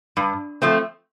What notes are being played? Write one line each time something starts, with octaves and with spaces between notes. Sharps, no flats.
G2
F3 A3 C4